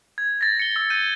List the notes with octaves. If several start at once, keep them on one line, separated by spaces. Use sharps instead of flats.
G#6
A6 A#6
C#7 G7
E6
G6 D#7